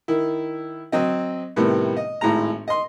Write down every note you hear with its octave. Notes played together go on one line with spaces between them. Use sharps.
D#3 E4
F#3 C4 D#5
A2 C3 D#3 G3 B3
D#5
G#1 A2 G#3 A#5
D#5 C6